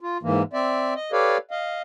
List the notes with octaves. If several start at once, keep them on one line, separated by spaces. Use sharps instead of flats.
F4
G#2 E3 A#3
C4 D5 E5
D#5
G4 A4 B4 C#5 D5 F5
D#5 F5